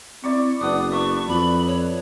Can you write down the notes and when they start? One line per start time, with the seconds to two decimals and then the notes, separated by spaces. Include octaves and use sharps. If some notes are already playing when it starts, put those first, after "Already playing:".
0.24 C4 E4 D5 C#6
0.61 F#1 B3 D4 D#6
0.92 D4 E5 C#6
1.28 F2 B5
1.67 C#5